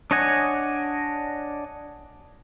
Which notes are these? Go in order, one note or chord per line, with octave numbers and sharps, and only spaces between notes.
D4 C#5 D#5 F#5 G#5